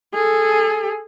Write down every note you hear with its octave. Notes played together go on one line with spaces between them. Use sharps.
G#4 A4